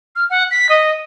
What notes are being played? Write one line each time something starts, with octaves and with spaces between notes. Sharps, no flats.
F6
F#5
B6
D#5